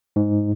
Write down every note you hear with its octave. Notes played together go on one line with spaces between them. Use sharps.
G#2